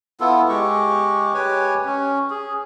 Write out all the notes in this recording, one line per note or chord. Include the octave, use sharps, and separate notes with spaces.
B3 E4 F4 A4
G#3 G4 C#6
G4 B4 C#5 G#5
C#4
G#4